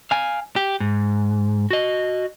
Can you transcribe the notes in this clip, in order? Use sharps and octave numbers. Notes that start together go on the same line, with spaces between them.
F5 G#5
G4
G#2
F#4 D#5